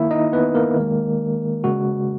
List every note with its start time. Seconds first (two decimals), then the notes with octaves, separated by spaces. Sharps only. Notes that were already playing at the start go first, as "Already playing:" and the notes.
Already playing: D#3 A#3 E4 E5
0.11 D#4 D#5
0.33 B3 B4
0.55 A#3 A#4
0.76 D#3 G#3
1.64 C#3 G#3 F#4